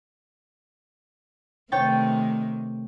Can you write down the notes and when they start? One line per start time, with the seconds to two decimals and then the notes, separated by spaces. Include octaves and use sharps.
1.72 C3 D#3 A3 C#5 G5 A6